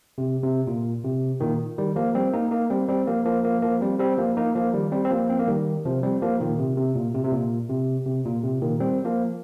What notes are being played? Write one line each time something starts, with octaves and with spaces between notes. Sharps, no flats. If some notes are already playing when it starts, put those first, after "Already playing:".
C3
C3
A#2
C3
A#2 D#3
D#3 G3
F3 A#3
G3 C4
A#3 D#4
A#3 D#4
G3 C4
G3 C4
F3 A#3
F3 A#3
F3 A#3
F3 A#3
G3 C4
G3 C4
F3 A#3
A#3 D#4
F3 A#3
D#3 G3
G3 C4
C4
F3 A#3
C4
A#3
D#3 G3
C3 F3
G3 C4
F3 A#3
A#2 D#3
C3
C3
A#2
C3
C3
A#2
C3
C3
A#2
C3
A#2 D#3
G3 C4
F3 A#3